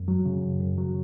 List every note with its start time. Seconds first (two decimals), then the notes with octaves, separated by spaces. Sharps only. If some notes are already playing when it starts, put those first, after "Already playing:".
Already playing: F#2
0.08 F#3
0.26 C#3
0.43 F#2
0.61 F#2
0.78 F#3